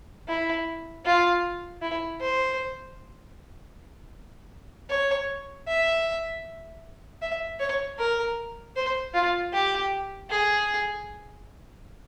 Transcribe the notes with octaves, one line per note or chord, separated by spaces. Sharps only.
E4
F4
E4
C5
C#5
E5
E5
C#5
A#4
C5
F4
G4
G#4